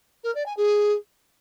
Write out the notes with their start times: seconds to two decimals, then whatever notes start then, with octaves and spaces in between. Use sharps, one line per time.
0.24 A#4
0.35 D5
0.46 G#5
0.57 G#4